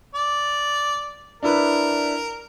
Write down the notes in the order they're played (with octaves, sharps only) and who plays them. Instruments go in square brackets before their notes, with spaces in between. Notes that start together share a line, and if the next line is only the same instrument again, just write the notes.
[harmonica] D5
[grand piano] D4 E4 B4 [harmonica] A#4